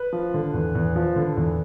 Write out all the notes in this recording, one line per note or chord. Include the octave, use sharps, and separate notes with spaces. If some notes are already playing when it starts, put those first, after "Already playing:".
Already playing: B4
F3
D3
E2
E2
F3
D3
E2